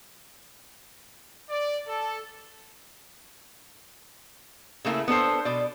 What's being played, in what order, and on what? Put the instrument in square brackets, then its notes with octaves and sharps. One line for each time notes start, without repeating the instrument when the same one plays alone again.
[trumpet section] D5
A4
[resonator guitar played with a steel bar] C#3 A3 A#3 E4
B3 D4 A4 C5
B2 D5